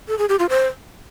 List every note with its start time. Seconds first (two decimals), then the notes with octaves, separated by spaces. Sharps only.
0.08 A4
0.19 G#4
0.29 G4
0.39 F4
0.50 C5